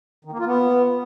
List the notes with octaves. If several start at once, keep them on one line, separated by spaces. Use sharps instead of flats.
D#3
A#3
F4
B3